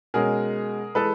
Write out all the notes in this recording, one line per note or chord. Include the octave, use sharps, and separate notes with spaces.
B2 G#3 C#4 G#4 A#4
E3 G#3 A4 B4